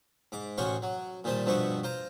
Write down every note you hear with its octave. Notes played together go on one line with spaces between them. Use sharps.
G#2 D6
A1 C#4 F#4 C5 F5 C#6
F#3
A#2 D#3 G3 C5 A5
G2 B2 F3 C4 B4 C#6
F4 C5 A#5